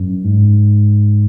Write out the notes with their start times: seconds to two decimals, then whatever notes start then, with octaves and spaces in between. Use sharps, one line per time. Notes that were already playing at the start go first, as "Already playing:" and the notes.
Already playing: F#2
0.24 G#2